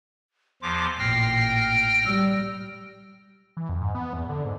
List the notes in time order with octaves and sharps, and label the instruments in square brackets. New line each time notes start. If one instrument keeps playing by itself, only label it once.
[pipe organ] E2 F3 D6 [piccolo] C6
[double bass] A1 A#2 [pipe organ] G5 F6 A#6 [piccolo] C7
[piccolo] D7
[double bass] G3 [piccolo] E6
[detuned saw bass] E3
F2
G#2
B3
E2
D3
G#2